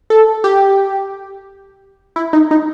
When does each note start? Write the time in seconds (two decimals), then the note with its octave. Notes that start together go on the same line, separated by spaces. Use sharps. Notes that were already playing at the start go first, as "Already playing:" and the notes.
0.10 A4
0.44 G4
2.16 E4
2.33 D#4
2.51 D#4